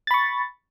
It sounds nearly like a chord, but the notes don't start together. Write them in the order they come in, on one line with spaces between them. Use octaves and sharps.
A6 B5 C#6